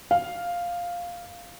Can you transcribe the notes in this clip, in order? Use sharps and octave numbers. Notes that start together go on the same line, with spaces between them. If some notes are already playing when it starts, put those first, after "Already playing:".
F5